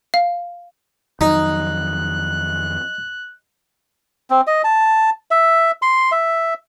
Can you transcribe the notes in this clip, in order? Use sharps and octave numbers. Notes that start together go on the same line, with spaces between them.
F5
F2 D#3 F#3 D#4 F#6
C4
D#5
A5
E5
C6
E5